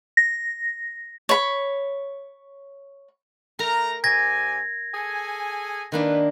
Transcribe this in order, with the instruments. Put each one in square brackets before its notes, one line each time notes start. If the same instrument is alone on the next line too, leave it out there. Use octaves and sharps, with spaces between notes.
[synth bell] A#6
[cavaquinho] C#5 B5
[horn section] A3 A#5 [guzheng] A#4
[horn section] C3 D5 G#5 [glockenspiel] G#6 A#6
[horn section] G#4 A4 G#5
[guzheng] D#3 A#3 D4 [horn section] B4